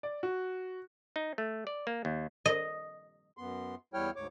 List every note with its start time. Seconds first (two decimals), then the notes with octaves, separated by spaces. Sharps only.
0.03 D5
0.23 F#4
1.16 D#4
1.38 A3
1.67 D5
1.87 A#3
2.05 D#2
2.46 D#5
3.37 F#2 B3 C6
3.94 E2 G3 E4 C#5 G5 F6
4.16 D2 G#2 C#5 D6